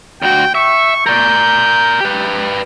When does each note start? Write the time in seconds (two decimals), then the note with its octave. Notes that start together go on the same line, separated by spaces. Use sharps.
0.22 D2 F#4 G5
0.55 E5 C#6
1.06 A#4 D5 G6
2.00 G4 B4